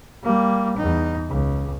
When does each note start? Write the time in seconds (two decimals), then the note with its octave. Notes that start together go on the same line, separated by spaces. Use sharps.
0.24 G3 A#3
0.77 E2 D#4
1.29 C#2